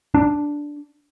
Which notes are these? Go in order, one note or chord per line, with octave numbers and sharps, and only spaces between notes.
D4